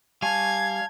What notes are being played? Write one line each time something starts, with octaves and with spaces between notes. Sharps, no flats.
G3 F5 G#5 A5 C#6 G#6